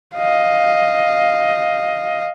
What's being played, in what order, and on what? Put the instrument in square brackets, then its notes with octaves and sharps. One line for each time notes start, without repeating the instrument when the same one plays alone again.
[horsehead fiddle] D#5 F5